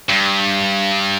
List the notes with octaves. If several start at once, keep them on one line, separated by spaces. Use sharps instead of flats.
G2